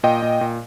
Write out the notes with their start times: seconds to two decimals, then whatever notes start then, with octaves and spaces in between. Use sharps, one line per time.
0.03 A#2 D#5 G5
0.22 A#2
0.41 A#2